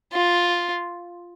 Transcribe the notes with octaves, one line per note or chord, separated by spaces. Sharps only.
F4